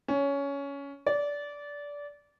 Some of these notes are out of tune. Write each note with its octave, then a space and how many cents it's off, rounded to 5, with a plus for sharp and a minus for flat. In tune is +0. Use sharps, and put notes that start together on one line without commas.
C#4 +15
D5 -20